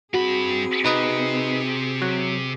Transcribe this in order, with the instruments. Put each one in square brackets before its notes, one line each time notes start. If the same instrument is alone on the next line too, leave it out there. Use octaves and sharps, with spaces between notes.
[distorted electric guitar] G2 B5 [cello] C4 G#4 [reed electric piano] F#4
[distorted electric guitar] C3 [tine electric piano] D#4 B4 D#5
[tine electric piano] F#3